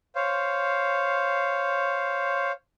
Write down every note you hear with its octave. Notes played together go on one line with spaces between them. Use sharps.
C5 C#5 F5